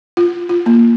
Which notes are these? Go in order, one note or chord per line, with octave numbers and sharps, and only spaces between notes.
F4
F4
A#3